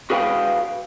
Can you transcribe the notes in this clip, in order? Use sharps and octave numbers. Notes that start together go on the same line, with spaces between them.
F#4 G#4 B4 F5 G5